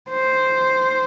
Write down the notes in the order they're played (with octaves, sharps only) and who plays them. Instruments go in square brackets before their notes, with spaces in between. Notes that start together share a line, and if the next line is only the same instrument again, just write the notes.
[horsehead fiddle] C5